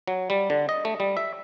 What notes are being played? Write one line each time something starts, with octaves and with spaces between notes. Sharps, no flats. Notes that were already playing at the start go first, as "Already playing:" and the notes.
F#3
G3
D3
D#5
A3
G3
E5